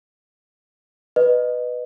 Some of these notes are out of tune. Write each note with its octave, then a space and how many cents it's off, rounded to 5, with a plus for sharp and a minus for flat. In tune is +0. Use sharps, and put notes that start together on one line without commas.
B4 +0 D#5 -20